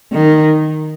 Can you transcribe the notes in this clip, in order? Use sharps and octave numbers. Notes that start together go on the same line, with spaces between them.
D#3